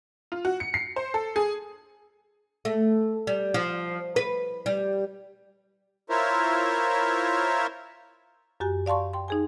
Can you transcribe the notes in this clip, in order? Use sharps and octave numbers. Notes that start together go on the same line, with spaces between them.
F4
F#4
C#7
C7
C5
A4
G#4
A3
G3
F3
B4
G3
E4 F4 A#4 C5 C#5 E5
F#2 F#4 G4 G#5
D5 F5 A5 C6 C#6
G5 C6
D#4 G#4 G#5